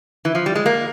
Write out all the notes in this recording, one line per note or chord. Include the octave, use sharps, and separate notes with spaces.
E3
F3
G3
G#3
A#3